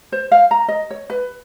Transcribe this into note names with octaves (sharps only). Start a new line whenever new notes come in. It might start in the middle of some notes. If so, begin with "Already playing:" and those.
C5
F5
A#5
D#5
C#5
B4